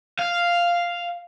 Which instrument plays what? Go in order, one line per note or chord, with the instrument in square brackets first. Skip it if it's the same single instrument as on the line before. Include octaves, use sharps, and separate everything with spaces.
[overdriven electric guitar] F5